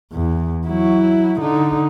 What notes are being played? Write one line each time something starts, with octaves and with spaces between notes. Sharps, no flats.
E2
F#3 E4
D3 D#4